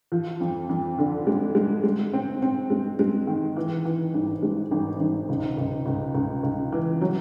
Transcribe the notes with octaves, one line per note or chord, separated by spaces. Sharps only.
F3
F2
F2
D3
G#3
G#3
G#3
C4
C4
G#3
G#3
D#3
E3
E3
G#1
G#3
G#1
G#1
C#2
C#2
C#2
C#2
C#2
E3
F#3